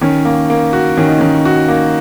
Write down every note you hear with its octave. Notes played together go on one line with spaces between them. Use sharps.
D#3 C#4
A#3
A#3
F#4
D#3 C#4
D#4
D#3 C#4
F#4
A#3